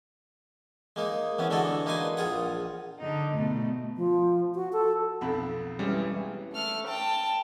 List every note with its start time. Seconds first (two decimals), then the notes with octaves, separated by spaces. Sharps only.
0.96 G#3 A#3 D#4
1.39 E3 B3 C#4
1.50 D3 E3 G#3 D4 F#4 A4
1.86 A#3 D#4 B4 C5 G#5
2.17 A#1 F4 G#4 F#5
2.99 D3 D#4
3.35 B2 A3
3.97 F3
4.55 F#4
4.73 A4
5.21 B1 F2 B5
5.79 E3 G3 G#3 C#4
6.52 A3 F6
6.87 G5 A5